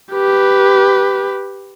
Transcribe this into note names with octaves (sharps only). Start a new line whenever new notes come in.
G4 B4